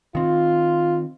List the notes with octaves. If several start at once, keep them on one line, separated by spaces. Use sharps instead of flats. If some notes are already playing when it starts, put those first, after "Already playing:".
D#3 C4 F4